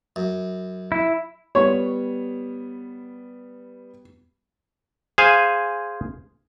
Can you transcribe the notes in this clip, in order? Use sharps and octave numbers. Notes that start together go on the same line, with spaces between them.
F#2
E4
G3 B3 C#5
G#4 C5 F5 G#5